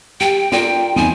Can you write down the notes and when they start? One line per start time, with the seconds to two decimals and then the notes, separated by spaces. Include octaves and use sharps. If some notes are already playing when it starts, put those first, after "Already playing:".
0.20 G4 G5
0.52 F4 A#4 D5 G5
0.96 E2 C4 D#4 G#5